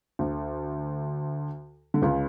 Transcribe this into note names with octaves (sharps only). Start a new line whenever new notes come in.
D2 D3
D3
C#2 C#3